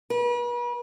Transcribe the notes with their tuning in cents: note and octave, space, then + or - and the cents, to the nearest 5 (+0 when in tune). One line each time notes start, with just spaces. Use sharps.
B4 -40